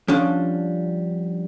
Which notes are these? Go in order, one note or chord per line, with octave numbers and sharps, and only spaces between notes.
F3 G3 C#4 D4